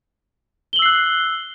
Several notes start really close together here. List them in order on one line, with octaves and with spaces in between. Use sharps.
G7 F#7 E6 C7 F#6